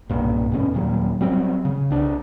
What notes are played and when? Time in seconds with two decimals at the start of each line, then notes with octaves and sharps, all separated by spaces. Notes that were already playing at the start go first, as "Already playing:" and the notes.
0.09 B1 G2 A#2
0.52 E2 G#2 B2 C#4
0.74 D#2 A#2 F#3 G3
1.21 F#3 G3 C4
1.65 C#3
1.91 C2 D4